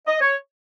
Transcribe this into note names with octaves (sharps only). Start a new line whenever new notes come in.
D#5
C#5